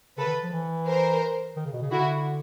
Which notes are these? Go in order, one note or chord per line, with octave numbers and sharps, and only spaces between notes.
C#3 A4 B4
D#3
F3
E3
A#4 C5
D#3
C#3
B2
C#3
D3 E4 F#4